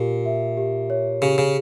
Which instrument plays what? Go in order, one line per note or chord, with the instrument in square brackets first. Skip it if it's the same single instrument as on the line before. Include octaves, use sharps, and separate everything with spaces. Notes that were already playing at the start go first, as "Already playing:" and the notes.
Already playing: [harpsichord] A#2 [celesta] G4
[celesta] E5
G4
C#5
[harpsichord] C#3 [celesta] G4
[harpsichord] C#3